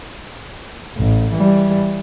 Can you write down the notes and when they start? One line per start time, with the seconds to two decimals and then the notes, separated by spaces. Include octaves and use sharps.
0.97 A1
1.34 E3 G3